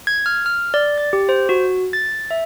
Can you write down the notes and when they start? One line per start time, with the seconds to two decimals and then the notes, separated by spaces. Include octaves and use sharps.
0.07 G#6
0.26 F6
0.46 F6
0.74 D5
0.98 A6
1.13 G4
1.29 C5
1.49 F#4
1.93 A6
2.31 E5